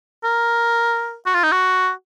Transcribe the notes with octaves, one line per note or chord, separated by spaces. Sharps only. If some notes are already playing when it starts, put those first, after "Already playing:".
A#4
F#4
F4
D#4
F#4